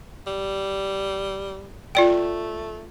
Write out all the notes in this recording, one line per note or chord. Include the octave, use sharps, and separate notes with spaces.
G3
A3 F4 D5 G5